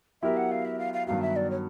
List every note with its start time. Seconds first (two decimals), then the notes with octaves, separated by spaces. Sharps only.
0.22 F#3 B3 E4 G4 A#4 E5
0.37 F#5
0.51 F5
0.65 E5
0.79 F5
0.93 F5
1.07 G2 D#3 F#3 B3 F5
1.22 E5
1.36 D5
1.50 C#5